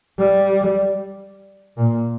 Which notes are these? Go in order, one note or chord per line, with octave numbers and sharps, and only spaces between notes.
G3
A#2